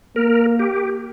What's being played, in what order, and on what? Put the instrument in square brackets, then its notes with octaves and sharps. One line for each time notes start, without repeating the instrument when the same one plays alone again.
[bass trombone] A#3 [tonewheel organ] A#4
[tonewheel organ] G4